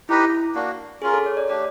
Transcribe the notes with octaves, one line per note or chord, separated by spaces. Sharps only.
D#4 E4 G4 B4 D#5
A#3 D4 F#4
C#4 F4 G#4 A#4
A4
C#5
D5
A3 D4 G4 D5